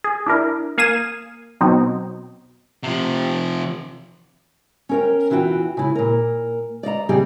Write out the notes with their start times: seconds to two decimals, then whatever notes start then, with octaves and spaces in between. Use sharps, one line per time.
0.04 G#4
0.27 D4 E4 A#4
0.78 A#3 F5 G#5 D#6 E7
1.61 B2 F#3 C4 D#4
2.83 C3 F3
4.89 C#4 A#4 G5
5.30 E2 E3 F4 F#4 G5
5.77 C#3 E4 G#5
5.95 A#2 A#4
6.83 D5 D#5 F5 A#5
7.09 C#3 G3 C4 G#4 G5 G#5